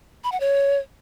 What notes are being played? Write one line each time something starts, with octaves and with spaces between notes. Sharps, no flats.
B5
F#5
C#5